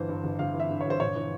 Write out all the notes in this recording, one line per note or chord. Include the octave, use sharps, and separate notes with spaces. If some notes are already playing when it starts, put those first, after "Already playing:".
Already playing: G1 E3 C5
G2
G1
G1 F5
E3
E5
G2
C#5
G1 C5
A#1 C#5
E3